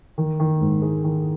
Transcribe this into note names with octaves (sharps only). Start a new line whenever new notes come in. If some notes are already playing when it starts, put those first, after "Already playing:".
D#3
D#3
G#2
G#3
D#3